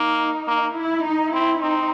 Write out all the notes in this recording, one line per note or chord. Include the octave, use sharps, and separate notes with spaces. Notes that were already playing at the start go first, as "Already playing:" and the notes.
Already playing: A#3 D#4
A#3
E4
D#4
C4 E4
C4 D#4